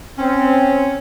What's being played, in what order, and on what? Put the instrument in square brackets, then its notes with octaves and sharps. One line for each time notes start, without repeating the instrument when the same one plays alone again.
[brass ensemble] C4 [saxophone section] C#4